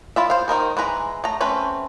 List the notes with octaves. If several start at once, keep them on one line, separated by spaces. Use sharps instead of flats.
E4 F4 E5
C5 F5
D#3 D#4 A#4 C5
E3 G#3 B4 A#5
A3 A#5
A3 C4 C#4 B4